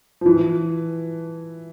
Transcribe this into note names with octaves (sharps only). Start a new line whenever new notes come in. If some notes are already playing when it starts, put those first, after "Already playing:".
F3
E3